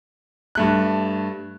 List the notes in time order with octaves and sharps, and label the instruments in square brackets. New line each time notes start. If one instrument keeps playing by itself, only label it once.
[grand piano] G2 A3 F#6